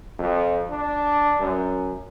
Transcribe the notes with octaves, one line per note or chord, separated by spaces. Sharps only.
F2
D4
F#2